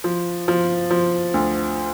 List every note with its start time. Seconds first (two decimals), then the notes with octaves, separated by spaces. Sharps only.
0.04 F3
0.48 F3
0.90 F3
1.34 D2